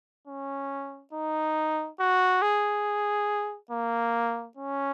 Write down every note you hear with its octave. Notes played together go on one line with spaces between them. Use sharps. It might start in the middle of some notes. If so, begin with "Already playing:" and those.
C#4
D#4
F#4
G#4
A#3
C#4